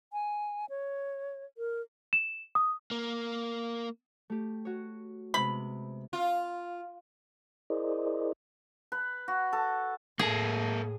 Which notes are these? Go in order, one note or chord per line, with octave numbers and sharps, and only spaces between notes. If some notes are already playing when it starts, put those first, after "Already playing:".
G#5
C#5
A#4
E7
D#6
A#3
A3 G4
F#4 C#5
C3 G#3 B3 B5
F4
E4 G#4 A#4 C5 D5 D#5
B4
F#4
A4
A2 A#3 G#4 A4